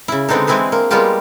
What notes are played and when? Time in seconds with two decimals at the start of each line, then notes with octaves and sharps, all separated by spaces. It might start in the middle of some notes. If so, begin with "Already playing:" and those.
0.08 C#3 E4
0.28 D3 G#3 B3 C4 D4 D#4
0.47 E3 G#3 C4 E4 G#4 B4
0.72 A#3
0.90 G3 G#3 A#3 B3 F4 G4